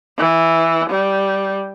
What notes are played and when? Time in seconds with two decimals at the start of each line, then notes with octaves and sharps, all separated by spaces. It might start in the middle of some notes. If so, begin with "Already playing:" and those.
0.18 E3
0.89 G3